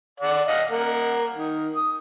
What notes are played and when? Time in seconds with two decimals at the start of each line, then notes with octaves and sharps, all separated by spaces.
0.20 D5 F#5
0.48 D#5 F5 F#5
0.70 A#3 F#5
1.35 D#3
1.75 D#6